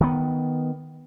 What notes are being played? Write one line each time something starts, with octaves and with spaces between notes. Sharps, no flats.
D#3 B3